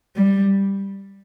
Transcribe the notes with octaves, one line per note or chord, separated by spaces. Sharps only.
G3